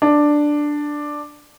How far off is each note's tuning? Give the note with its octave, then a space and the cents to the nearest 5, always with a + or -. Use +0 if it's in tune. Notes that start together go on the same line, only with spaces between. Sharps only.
D4 +5